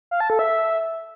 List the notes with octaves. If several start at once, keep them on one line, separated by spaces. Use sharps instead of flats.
F5
A5
A4
E5